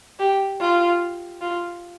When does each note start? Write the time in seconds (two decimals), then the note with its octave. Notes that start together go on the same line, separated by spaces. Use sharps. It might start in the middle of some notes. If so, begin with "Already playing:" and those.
0.19 G4
0.60 F4
1.41 F4